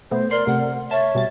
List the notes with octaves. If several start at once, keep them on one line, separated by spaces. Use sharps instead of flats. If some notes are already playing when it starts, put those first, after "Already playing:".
B2 A3 B3 C5
A#4 D5 C6
C3 A3 F#5
C#5 E5 A5
B2 G3 A6